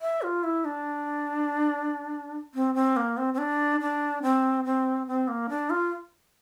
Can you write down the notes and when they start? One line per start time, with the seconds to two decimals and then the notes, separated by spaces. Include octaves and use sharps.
0.01 E5
0.22 F4
0.43 E4
0.65 D4
2.55 C4
2.75 C4
2.96 A#3
3.17 C4
3.34 C4
3.38 D4
3.81 D4
4.23 C4
4.65 C4
5.07 C4
5.28 A#3
5.49 D4
5.70 F4